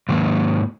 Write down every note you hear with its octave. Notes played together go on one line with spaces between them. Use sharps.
G#2 D#3 A#3